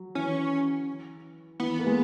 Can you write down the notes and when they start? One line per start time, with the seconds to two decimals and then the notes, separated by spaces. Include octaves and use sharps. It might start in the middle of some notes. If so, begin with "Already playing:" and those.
Already playing: F#3
0.15 E3 C#4
1.60 E3 B3
1.79 A#3
1.87 G#3